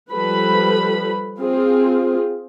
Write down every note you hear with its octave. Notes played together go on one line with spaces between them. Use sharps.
F3 G3 A4 B4 B5
C4 F4 G#4